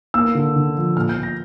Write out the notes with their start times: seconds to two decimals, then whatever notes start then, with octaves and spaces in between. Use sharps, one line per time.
0.14 A#3 E6
0.35 D3
0.56 D3
0.76 F3
0.96 A#2 F6
1.09 G6
1.16 A#2
1.23 A#6